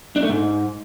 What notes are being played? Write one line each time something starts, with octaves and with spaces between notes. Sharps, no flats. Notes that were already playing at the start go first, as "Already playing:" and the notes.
D4
A3
G#2